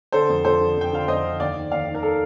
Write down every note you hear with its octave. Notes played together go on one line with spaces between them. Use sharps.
D3 A4 C5
F2
F3 A4 C5
D3
F2 G5
D3 F5
F2 C5 D#5
D3
D#2 D5 F5
D#3
D#2 D5 F5
D#3
A#4
A4